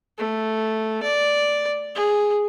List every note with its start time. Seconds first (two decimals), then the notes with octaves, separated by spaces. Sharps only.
0.18 A3
1.03 D5
1.95 G#4